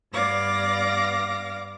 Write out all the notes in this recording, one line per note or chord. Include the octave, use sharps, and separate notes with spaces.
G2 B3 D5 F5 D6 A#6